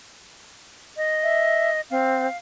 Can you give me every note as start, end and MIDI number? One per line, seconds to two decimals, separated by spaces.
0.97 1.81 75
1.23 1.71 76
1.90 2.27 60
1.90 2.37 77